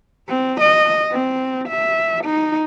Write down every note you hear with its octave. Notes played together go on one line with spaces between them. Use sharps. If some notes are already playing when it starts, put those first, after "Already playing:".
C4
D#5
C4
E5
D#4